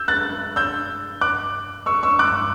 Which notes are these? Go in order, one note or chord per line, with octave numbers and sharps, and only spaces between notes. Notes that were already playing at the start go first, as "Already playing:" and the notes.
Already playing: E6 G6
F#6 A6
E6 G6
D6 F#6
C#6 E6
C#6 E6
D6 F#6